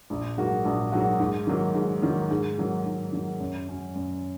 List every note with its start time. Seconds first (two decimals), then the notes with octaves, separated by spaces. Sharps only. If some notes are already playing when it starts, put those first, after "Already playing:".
0.10 A#1
0.37 G#2 F#3 A#3 F#4
0.65 A#1
0.92 G#2 F#3 A#3 F#4
1.20 G#2
1.47 D#3 F#3 A#3
1.75 G#2
2.02 D#3 F#3 A#3
2.31 G#2
2.58 D#3 F#3 A#3
2.86 G#2
3.12 D#3 F#3 A#3
3.40 F#2
3.69 F#3 C#4
3.95 F#2